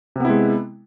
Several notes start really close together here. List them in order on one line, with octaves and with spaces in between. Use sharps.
C3 B3 E4 G#3